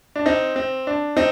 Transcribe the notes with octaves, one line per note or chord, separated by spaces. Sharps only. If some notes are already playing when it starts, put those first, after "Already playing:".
D4
C4 D#4
C4
D4
C4 D#4